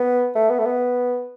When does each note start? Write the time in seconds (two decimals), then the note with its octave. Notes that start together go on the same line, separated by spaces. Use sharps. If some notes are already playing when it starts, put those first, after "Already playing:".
Already playing: B3
0.35 A3
0.50 B3
0.59 A3
0.66 B3